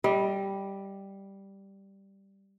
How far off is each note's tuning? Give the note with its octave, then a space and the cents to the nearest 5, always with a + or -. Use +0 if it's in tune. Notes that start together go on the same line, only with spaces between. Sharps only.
G3 +0 D#5 +30